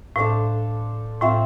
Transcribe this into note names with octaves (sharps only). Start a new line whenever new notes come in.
A2 D4 A4 C5 F5
A2 C4 F4 C5 E5